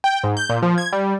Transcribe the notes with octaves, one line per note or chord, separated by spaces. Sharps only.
G5
G#2
G6
A#2
F3
G#6
G3